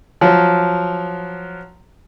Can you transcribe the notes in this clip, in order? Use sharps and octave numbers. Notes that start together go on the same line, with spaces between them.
F3 F#3